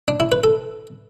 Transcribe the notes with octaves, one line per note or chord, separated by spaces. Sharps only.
D4
E4
B4
A4